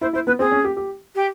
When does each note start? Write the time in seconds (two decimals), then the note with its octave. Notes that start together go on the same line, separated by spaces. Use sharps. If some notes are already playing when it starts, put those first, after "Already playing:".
0.01 E4 C5
0.13 E4 C5
0.26 B3 B4
0.39 C4 G#4
0.51 C#4
0.64 G4
0.77 G4
1.15 G4